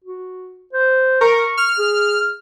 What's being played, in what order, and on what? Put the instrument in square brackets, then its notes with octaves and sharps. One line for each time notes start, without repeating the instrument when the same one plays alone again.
[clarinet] F#4
C5
[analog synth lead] A#4 [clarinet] C#6
[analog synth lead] F6
[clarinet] G#4